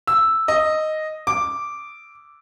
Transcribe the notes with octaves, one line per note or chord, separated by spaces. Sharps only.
E6
D#5
D6